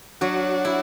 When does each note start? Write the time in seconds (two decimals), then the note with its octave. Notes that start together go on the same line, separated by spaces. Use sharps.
0.21 F#3 D4 F#4
0.65 E4